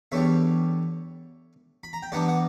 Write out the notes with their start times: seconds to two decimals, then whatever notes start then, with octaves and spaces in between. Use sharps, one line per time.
0.12 E2 D3 G3 C#5 E5
1.84 B5
1.93 A#5
2.03 G5
2.12 G2 E3 B3 D4 D5 F#5
2.28 F#5